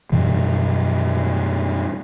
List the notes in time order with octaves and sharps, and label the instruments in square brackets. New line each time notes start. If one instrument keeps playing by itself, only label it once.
[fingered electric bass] F#2 B2 E3 G3